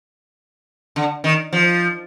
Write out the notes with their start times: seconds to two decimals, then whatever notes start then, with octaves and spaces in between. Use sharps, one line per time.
0.96 D3
1.24 D#3
1.53 F3